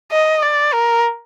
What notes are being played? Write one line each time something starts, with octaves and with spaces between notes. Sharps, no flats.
D#5
D5
A#4